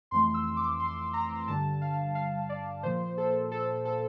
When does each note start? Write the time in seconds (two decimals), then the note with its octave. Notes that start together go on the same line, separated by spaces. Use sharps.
0.11 F2 E3 A3 C6
0.34 E6
0.57 D6
0.80 C6
1.13 A#5
1.47 G2 D3 G3 A5
1.81 F5
2.15 F5
2.49 D5
2.83 A#2 F3 A#3 C5
3.18 A4
3.52 A4
3.85 A4